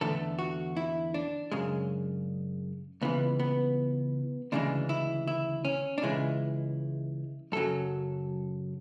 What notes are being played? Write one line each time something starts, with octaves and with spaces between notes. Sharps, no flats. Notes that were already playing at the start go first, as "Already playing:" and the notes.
E2 D3 A3 A4
F#4
E4
D4
F#2 C#3 G#3
C#2 C#3 E3 B3
B3
D2 C#3 E3 G#3 D4
E4
E4
C#4
D4
C#2 C#3 E3 G#3 E4
F#2 C#3 F#3 A4